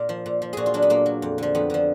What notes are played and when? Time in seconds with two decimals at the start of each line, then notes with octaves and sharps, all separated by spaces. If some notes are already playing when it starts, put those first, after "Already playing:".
Already playing: A#2 A#4
0.09 F3
0.26 A#2
0.42 F3
0.53 A#2 F#4 G#4
0.66 F4
0.74 F#3 D4
0.82 B3
0.90 A#2 A#3
1.06 F#3
1.22 F2
1.38 D3 F3
1.55 F2 B3
1.70 D3 F3